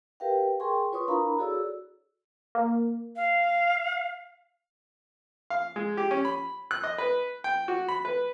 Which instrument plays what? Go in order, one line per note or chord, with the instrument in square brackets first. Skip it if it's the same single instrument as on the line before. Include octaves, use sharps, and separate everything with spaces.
[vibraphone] G4 A#4 B4 E5 F5 G5
G#4 A#4 G5 G#5 C6 C#6
F4 B4 C#5 C6 C#6 D#6
D4 E4 A#4 F5 A#5 B5
F#4 G#4 A4 C#5 D5 E6
[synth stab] A#3
[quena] F5
[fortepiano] F5
G#3
G4
C#4
B5
F#6
D#5
B4
G5
F#4
B5
B4